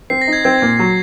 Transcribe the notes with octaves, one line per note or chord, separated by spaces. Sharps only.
C4 C7
A#6
D#4
G#6
C4 G#6
A#2
F#3